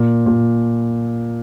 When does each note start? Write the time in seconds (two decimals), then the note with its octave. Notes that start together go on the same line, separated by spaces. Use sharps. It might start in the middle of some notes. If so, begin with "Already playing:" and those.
Already playing: A#2
0.26 A#2